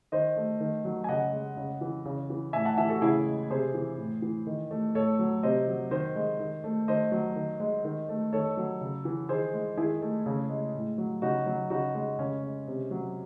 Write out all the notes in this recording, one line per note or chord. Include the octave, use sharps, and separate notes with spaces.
D#3 C5 D#5
A3
D#3
F#3
G#5
C#3 D#5 F#5
G#3
C#3
E3
C#3
E3
A2 E5 G#5
F#5 A5
E3 E5 G#5
F#4 A4
C#3 E4 G#4
G#3
C3 G#4 C5
E3
A2
E3
D#3
A3
A2 A4 C#5
F#3
C3 C5 D#5
F#3
D#3 C5 D#5
G#3
D#3
A3
D#3 C5 D#5
F#3
D#3
G#3
D#3
A3
D#3 A4 C#5
F#3
C#3
E3
D#3 G#4 C5
G#3
D#3 E4 G#4
A3
C#3
G#3
A2
F#3
C#3 D#4 F#4
F#3
C#3 D#4 F#4
G#3
C#3 C#4
G#3
C3
F#3